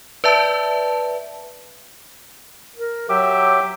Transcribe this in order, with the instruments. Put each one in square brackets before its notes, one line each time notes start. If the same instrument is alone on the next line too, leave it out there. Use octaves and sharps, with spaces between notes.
[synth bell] B4 D5 E5 A5
[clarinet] A#4
[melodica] F#3 G4 E5 [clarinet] D6